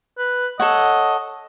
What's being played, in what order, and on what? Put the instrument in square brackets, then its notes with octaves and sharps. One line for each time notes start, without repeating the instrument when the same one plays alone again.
[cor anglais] B4
[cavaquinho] A4 C#5 F#5 [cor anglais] D#5